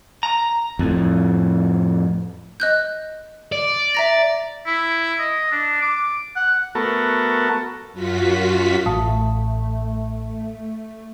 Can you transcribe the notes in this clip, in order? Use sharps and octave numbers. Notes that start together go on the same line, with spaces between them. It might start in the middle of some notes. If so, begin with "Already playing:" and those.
A#5
F2 A2
D#5 F#6 G6
D5
E5 A#5 A#6
E4
D#5
D4
D6
F#5
A3 B3 F#4 A4 A#4
F#2 F4 F#4 B6
A1 A3 F5 A5 D#6